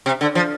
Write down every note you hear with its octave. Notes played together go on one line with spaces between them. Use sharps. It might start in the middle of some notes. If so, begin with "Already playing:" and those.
C3
D3
F3